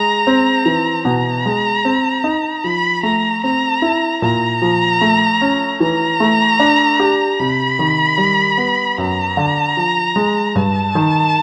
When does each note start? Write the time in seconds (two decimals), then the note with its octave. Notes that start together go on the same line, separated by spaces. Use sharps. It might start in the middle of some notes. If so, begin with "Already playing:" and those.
Already playing: G#3 A#5
0.27 C4
0.66 E3
1.05 B2 A#5
1.46 G#3
1.85 C4
2.24 D#4
2.64 F3 B5
3.03 A3 A#5
3.43 C4 A#5
3.82 E4
4.22 A#2 A#5
4.62 F3
5.01 A3
5.41 C#4
5.80 E3 A#5
6.20 A3
6.60 D4
7.00 G4
7.40 C3 B5
7.79 D#3
8.18 G3
8.58 B3
8.97 F#2 A#5
9.37 D3
9.77 F3
10.16 G#3
10.55 G2 A5
10.95 D#3